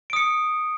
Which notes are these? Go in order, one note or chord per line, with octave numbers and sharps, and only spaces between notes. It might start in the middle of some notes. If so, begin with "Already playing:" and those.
D#6 C#7 D7